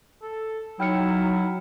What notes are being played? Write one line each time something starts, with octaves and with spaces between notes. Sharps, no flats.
A4
F#3 D#4 E4 G5 F6 C#7